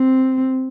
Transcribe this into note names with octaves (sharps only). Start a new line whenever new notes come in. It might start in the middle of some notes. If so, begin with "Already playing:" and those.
Already playing: C4